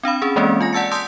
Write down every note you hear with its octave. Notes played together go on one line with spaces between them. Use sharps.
C4 D4 F5 B5
C#4 G#4
E3 G#3 A#3 C4 C#4 D5
F4 G#5 A#6
D5 F#5 A5 E6 A6 C#7
A5 C6 D#6 E6 G6 B6